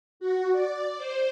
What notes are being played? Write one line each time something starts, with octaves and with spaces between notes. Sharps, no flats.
F#4
D5
C5